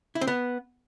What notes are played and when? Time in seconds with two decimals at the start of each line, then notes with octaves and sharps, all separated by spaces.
0.15 E4
0.21 C4
0.27 B3